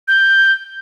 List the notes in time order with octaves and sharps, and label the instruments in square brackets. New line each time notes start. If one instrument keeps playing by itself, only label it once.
[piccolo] G6